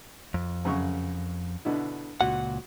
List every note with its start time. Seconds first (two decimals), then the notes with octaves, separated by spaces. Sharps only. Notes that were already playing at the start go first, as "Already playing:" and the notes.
0.34 F2
0.65 F#2 C#3 C#6
1.65 B2 D3 E4
2.21 C#2 A#2 F#4 F#5